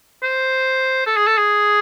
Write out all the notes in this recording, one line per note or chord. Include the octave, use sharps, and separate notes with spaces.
C5
A4
G#4
A4
G#4